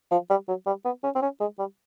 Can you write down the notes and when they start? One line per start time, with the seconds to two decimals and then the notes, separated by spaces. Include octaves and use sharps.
0.12 F3
0.30 G3
0.48 F#3
0.67 G3
0.85 B3
1.04 C#4
1.16 C4
1.22 C#4
1.40 G#3
1.59 G3